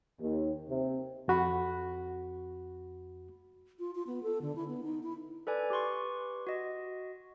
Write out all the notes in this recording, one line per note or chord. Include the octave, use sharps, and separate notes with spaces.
D#2
C3
F2 F#4 B5
F4
F4
B3
A4
D3
E4
B3
D#4
E4
A4 B4 D5 G#5
G4 B4 C6 C#6
F#4 D#5